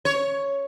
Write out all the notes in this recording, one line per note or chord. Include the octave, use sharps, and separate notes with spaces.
C#5